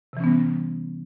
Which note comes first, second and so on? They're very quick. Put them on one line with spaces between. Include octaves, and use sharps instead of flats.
C3 E3 C#4 B3 G3